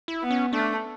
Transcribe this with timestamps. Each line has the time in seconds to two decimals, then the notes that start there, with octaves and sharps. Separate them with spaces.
0.08 E4
0.23 B3
0.31 C#4
0.53 A3 D4